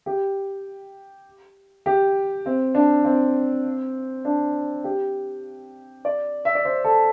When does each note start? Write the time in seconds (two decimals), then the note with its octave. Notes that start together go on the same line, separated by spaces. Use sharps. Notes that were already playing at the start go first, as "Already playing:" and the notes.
0.06 G4
1.86 G4
2.46 C4
2.75 D4
3.05 C4
4.25 D4
4.84 G4
6.05 D5
6.45 E5
6.55 D5
6.65 C5
6.84 A4